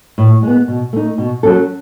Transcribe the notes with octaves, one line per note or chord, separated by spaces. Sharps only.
A2
G#3 B3
B2
A3 D#4
B2
F#3 C#4 F#4 A4